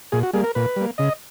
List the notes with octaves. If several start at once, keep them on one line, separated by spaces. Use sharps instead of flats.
A#2 G#4
F#4
G3 A#3 G#4
A#4
A#2 B4
G3 A#3
C#3 D#5